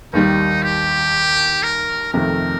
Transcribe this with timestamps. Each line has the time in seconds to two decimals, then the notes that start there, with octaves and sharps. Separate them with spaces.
0.13 D#2 D#3 G3 D#4
0.63 G4
1.63 A#4
2.13 F2 C3 D#3 A3 A#4